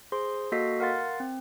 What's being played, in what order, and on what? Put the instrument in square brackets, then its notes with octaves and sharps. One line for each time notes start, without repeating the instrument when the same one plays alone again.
[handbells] G#4 C5 C6
A#3 F#4 A4 D#5 B6 C7
A#4 F5 F#5 C6 A6
C4